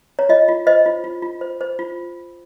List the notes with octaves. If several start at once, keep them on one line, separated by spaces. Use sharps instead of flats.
C#5
F4 D#5
F4
C5 D#5
F4
F4
F4
C5
C5
F4